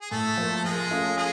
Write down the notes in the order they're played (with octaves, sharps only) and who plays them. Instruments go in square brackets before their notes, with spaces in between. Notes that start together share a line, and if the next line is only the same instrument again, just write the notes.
[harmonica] G#4
[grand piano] A2 [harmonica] A3 A4
[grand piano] F3 A#3
[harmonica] A4
[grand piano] F3 [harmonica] G#3 G#4
[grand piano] A3 C#4 F4
[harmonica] G#3 G#4